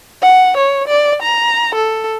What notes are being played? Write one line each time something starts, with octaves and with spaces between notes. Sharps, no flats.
F#5
C#5
D5
A#5
A4